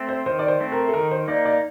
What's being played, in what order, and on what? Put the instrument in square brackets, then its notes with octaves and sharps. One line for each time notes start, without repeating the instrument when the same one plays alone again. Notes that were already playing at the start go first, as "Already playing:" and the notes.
Already playing: [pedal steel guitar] A3 C4
[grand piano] C5
[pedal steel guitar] D#3 [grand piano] C5
[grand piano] D5
C5
[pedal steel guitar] A3 C4
[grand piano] A#4
A4
[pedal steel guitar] D#3 [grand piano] A#4
[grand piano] C5
[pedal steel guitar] A#3 D#4 [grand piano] D5
[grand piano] D5